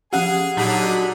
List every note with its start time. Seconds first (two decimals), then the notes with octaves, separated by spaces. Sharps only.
0.13 F3 C#4 G4 G#4 F5 F#5 G#5
0.57 A#2 D3 F#3 D4 D#4 G4 G#4 B5